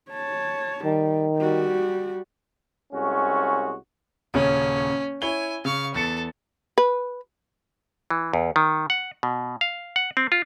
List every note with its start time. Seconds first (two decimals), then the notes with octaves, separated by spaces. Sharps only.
0.11 C#5 A5
0.85 D#3 G3
1.37 G3 F#4
2.93 C2 G#3 C#4 F#4
4.34 D#1 C#3 C#4 C#5
5.22 E4 C#5 G#5 G7
5.65 C#3 F5 C#6
5.94 E2 A4 A6 C#7
6.78 B4
8.11 E3
8.33 E2
8.56 D#3
8.90 F#5
9.23 B2
9.61 F5
9.96 F#5
10.17 C4
10.32 F4